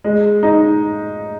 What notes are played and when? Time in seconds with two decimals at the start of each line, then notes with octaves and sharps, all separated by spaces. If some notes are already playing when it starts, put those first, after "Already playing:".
0.04 G#3
0.43 D#4